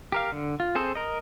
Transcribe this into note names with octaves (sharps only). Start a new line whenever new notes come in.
G4 A#4 F5
D3
F4
C4 G#4 A4 C5
A#4 D#5